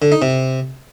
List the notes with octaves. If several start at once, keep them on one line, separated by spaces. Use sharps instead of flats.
D3
D#4
C3